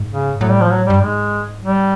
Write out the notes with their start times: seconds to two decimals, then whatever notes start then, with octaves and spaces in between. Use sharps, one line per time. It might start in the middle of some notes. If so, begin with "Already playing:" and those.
Already playing: G#2
0.10 C#3
0.41 A2 F#3
0.51 G3
0.61 F3
0.70 F#3
0.86 G2 G3
1.01 G#2 G#3
1.62 G3